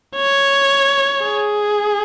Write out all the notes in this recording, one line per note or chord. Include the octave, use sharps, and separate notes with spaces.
C#5
G#4